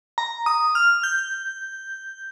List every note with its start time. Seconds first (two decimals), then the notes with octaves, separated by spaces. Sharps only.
0.18 A#5
0.46 D#6
0.75 F6
1.04 G6